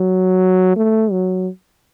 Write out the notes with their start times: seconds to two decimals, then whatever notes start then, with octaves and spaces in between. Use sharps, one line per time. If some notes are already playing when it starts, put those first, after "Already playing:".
Already playing: F#3
0.76 A3
1.12 F#3